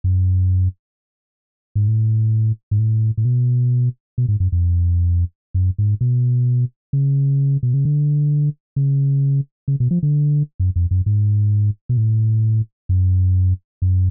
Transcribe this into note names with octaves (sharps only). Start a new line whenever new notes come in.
F#2
G#2
A2
G#2
A2
A2
B2
B2
G#2
F#2
F2
F#2
G#2
B2
C#3
B2
C#3
D3
C#3
C#3
B2
F3
D3
F#2
F2
F#2
G#2
B2
A2
F#2
F#2